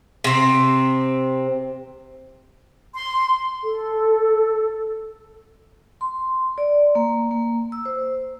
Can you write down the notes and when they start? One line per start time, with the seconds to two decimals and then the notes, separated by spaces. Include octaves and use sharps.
0.24 C3 C4
2.94 C6
3.63 A4
6.01 C6
6.58 D5
6.95 A#3
7.31 A#3
7.72 E6
7.85 C5